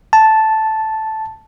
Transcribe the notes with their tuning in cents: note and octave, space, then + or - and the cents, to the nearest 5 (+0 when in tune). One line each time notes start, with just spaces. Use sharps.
A5 -5